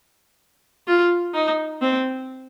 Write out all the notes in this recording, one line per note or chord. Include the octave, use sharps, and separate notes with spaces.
F4
D#4
C4